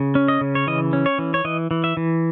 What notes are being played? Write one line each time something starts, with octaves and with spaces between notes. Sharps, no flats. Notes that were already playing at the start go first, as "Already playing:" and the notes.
Already playing: C#3
C#4
D#5
C#3
C#5
E3 D#5
C#4
C#5
E3
C#5
E3 D#5
E3
E5
E3